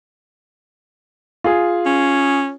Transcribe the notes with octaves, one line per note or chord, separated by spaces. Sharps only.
F4 G#4
C#4